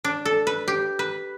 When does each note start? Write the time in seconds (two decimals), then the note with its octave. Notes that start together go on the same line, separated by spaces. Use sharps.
0.04 D4
0.25 A4
0.47 B4
0.68 G4
0.99 B4